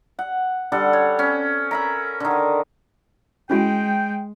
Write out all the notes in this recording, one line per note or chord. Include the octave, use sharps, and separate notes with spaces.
F#5
D3 G3 A4 F#5
C#5
C4 C#4
A#4 E5 B5
D3 D#3
G#3 C#4 E4 F#4 G5